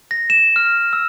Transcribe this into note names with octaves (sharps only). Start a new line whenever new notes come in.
A#6
E7
F6
E6